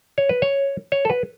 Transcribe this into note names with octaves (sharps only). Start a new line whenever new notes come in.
C#5
B4
C#5
C#5
A4
B4